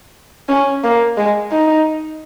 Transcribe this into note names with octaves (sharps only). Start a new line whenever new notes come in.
C#4
A#3
G#3
D#4